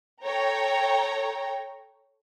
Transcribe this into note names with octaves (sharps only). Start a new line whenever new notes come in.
A4 C#5 G5 A#5